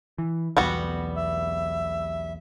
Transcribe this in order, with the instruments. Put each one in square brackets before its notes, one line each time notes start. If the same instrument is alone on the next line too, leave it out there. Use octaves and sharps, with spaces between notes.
[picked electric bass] E3
[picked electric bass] B1 E2 [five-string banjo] G3 B3 F#4
[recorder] E5